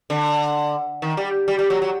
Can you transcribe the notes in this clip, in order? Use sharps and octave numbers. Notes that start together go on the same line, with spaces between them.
D3
D#3
G3
G3
G3
F#3
F#3